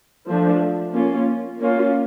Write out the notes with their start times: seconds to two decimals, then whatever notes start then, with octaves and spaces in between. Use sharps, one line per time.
0.29 F3 A3 D4
0.94 A#3 C#4 F4
1.59 A#3 C#4 F4